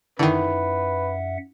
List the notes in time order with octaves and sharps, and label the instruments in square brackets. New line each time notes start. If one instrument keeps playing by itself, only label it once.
[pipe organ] F#2 E5 F#5 [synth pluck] D3 D#3 [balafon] D#4 E4 [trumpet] B4